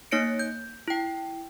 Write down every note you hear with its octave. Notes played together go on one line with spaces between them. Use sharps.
A#3 D#4 C#5 A#6 C#7 D7
G6
E4 G5